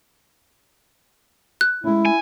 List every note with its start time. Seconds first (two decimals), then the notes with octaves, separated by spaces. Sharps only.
1.61 F#6
1.84 G#3 C#4 E4
2.05 G#5